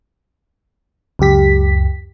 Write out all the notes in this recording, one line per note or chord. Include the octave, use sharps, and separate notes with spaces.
C#2 F#2 G4 B6